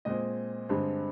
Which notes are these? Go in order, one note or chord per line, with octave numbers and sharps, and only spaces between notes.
A#2 G#3 C4 D#5
G2 D3 G#3 C4